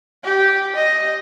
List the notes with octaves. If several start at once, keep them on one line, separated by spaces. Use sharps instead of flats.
G4
D#5